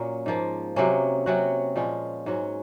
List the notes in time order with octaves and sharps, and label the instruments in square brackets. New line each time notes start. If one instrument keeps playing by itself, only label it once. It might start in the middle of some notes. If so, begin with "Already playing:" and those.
Already playing: [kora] A#2 F#3 A#3 C#4
G#2 F3 A#3
C3 F#3 A#3 C#4
C3 F#3 C#4 F#4
A#2 F3 G#3 C#4
G#2 F#3 C#4